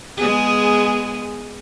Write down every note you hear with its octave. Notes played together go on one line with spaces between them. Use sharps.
G#3 B3 G#4